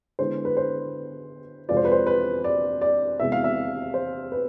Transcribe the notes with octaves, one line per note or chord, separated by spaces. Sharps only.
D3 G#3 B3 E4 C5
B4
C5
F2 C3 G#3 C4 F4 D5
C5
B4
C5
B4
D5
D5
E2 C3 G#3 E5
F5
E5
C5
B4